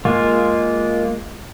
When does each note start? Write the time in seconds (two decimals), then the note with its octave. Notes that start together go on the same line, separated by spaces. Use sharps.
0.05 G#3 A#3 F4